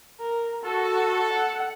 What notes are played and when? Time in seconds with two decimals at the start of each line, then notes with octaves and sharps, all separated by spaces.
0.20 A#4
0.64 F#4 A4
1.34 F#5